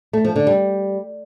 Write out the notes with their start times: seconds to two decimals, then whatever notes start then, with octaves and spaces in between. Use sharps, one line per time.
0.13 A3
0.25 F3
0.36 D3
0.47 G3